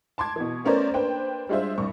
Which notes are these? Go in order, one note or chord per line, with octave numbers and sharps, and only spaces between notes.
A5 C6 D6 G#6
B2 E3
A3 B3 C#4 A#4 C5 D5
A#3 D4 B4 C5 G5
G3 G#3 D4 F4 C5 E5
C2 G2 C#6